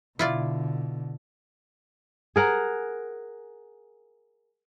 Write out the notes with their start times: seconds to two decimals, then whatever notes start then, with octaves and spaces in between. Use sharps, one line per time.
0.19 B2 D3 E4 F4 D5
2.36 G#4 A#4 F#5